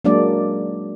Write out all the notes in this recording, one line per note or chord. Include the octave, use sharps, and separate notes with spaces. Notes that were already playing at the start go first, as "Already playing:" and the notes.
F#3 G#3 A#3 D4 D5